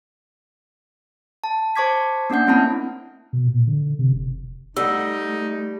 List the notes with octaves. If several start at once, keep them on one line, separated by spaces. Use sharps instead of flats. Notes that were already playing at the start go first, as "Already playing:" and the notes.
A5
C5 A5 C#6 D6 G#6 B6
A#3 C#4 D4 F#5 G6
A3 A#3 C4 E4 A5 B5
B2
A#2
D3
C3
F1
G3 A3 D#4 F#5 E6